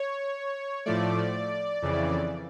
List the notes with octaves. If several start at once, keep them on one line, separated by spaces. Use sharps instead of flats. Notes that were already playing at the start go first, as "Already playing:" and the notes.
Already playing: C#5
A2 F3 A3 D5
F2 C#3 E3